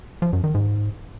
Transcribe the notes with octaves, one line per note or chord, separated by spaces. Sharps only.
F3
F#2
D#3
G#2